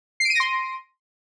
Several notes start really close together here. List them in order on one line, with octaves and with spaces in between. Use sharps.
C7 D7 D#7 A#6 C6